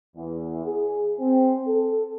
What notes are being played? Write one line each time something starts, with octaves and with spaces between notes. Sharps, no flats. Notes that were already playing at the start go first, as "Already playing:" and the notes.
E2
G#4
C4
A4